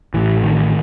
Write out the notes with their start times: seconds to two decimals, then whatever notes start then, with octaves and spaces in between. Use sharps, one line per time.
0.14 A1 A2 E3
0.43 D#3